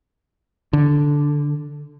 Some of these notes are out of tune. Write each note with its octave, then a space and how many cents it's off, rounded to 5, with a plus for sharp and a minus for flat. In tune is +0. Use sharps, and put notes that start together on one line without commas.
D3 -5